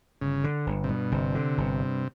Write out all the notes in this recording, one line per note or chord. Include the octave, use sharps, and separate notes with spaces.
G1 C#3
D3
G1
C3
G2 B2
G1 C3
D3
G1
G2